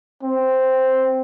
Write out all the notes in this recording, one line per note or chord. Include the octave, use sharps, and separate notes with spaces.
C4